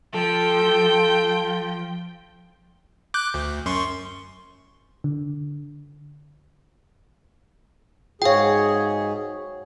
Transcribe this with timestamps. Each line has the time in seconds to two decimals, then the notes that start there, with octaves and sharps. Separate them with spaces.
0.14 F3 A4 G5
3.14 D6 F#6 G6
3.34 D2
3.66 F#2 C6 C#6
5.04 D3
8.22 G#2 F#4 G#4 C#5 F5 G5